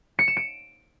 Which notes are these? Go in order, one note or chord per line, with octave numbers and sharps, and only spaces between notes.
C#7
E7
D7